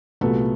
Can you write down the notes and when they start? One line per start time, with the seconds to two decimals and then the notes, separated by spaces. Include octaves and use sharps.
0.21 C2 A#2 F#3 A3 B3